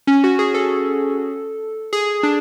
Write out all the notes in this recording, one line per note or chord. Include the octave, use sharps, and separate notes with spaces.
C#4
F#4
G#4
A4
G#4
D4